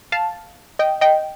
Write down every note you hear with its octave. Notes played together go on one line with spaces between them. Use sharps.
F5 A5
D#5 G5
D#5 G5